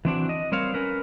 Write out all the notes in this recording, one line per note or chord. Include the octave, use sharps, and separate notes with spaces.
E3 C4 D4 F#4
D#5
G3 C4 A#4 C5 C#5 F5
C#4 A#4 B4